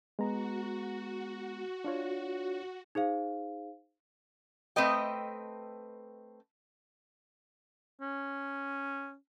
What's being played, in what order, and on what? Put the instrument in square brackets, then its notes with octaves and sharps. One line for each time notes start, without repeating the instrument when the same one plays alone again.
[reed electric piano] G#3 B3 A#5 [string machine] F#4
[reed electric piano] D4 F4 C#5
[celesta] D#4 G#4 C5 F5
[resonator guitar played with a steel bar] A3 C4 B4 D#5 G5
[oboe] C#4